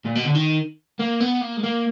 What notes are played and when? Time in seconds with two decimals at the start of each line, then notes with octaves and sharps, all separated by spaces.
0.06 A#2
0.16 B2
0.26 D3
0.35 D#3
0.99 A#3
1.20 B3
1.41 A#3
1.57 G#3
1.63 A#3